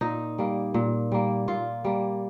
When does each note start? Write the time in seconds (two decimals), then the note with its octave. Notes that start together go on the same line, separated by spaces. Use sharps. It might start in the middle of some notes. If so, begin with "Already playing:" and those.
0.01 A#2 D#4
0.38 G3 A#3
0.74 A#2
1.12 G3 A#3
1.48 A#2 F4
1.84 G3 A#3